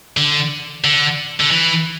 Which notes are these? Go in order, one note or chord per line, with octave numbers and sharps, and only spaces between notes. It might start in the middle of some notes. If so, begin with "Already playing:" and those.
D3
D3
D3
E3